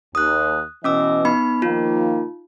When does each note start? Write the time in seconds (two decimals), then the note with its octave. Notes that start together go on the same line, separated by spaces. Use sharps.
0.15 D#2 D#6 F#6
0.84 B2 E3 C#4 D#5 D6 E6
1.25 B3 D#4 B5
1.62 D#3 F3 A#3 D#4 F4